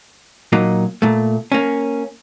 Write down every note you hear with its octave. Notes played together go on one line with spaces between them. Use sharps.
A#2 F#3 A#3 D#4
A#2 A3
A#3 C#4